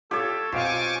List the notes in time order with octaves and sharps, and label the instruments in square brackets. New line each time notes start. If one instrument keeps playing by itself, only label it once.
[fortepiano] F4 [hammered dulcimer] G4 C#5 [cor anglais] A4
[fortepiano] B1 F5 [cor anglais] C4 [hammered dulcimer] F4 [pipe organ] G#5 C#6 D6